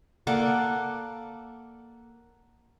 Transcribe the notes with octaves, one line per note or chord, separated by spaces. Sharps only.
A#3 A4 D5 F#5